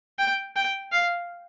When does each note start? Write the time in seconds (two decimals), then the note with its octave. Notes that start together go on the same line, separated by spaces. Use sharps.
0.19 G5
0.56 G5
0.92 F5